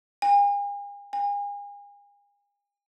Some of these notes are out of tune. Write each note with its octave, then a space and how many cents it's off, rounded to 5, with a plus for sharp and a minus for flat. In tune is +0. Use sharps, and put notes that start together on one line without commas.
G#5 -45
G#5 -40